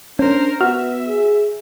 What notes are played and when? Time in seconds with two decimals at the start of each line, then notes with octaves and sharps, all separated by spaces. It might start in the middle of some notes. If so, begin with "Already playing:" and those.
0.19 C#4 D4 A#4 C5
0.61 B3 F#4 E5 F6
1.08 G#4